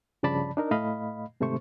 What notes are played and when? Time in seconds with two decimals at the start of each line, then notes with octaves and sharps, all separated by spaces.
0.23 G2 C#3 F3 D5 A5 B5
0.57 D4 D#4 A#4
0.71 A2 A3 D#5 F5 B5
1.40 G#2 C3 D#3 A3 C5 C#6